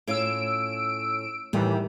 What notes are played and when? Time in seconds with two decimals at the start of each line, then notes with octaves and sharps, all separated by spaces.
0.07 A2 C#4 F4 E6 D7
1.53 A2 D#3 E3 G3